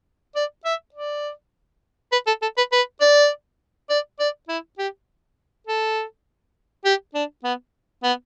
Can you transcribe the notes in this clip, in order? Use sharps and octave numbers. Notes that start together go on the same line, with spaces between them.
D5
E5
D5
B4
A4
A4
B4
B4
D5
D5
D5
E4
G4
A4
G4
D4
B3
B3